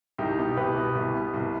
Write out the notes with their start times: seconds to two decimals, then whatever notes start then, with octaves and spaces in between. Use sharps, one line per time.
0.18 C2 D#4 G4
0.38 B2
0.56 C2 G4 B4
0.76 B2
0.95 C2
1.14 B2
1.34 C2